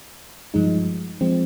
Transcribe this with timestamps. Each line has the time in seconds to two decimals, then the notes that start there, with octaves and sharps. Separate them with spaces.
0.54 G2 F3 G#3 D#4
1.21 F3 G#3 C4